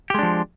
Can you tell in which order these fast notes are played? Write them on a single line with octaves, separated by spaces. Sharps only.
G4 G#3 D4 F3